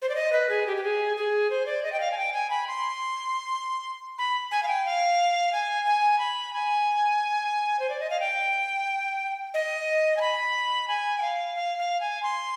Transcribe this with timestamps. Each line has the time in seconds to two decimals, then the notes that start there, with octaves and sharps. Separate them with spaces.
0.02 C5
0.09 D5
0.15 D#5
0.33 B4
0.49 G#4
0.67 G4
0.77 G4
0.83 G#4
1.17 G#4
1.50 C5
1.66 D5
1.83 D#5
1.92 G5
2.00 F5
2.12 G#5
2.17 G5
2.33 G#5
2.50 B5
2.67 C6
4.18 B5
4.51 G#5
4.63 F5
4.68 G5
4.86 F5
5.53 G#5
5.85 G#5
6.19 B5
6.53 G#5
7.80 C5
7.89 D5
8.00 D#5
8.10 F5
8.20 G5
9.54 D#5
10.17 G#5
10.21 B5
10.88 G#5
11.18 G5
11.22 F5
11.56 F5
11.78 F5
12.00 G#5
12.23 C6